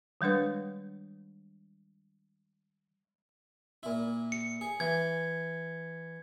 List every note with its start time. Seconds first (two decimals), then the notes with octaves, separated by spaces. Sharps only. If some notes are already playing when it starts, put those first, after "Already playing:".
0.21 D#3 G3 G#3 D4 B4
3.83 A#2 E4
4.32 C#7
4.61 G#4
4.80 E3 G#6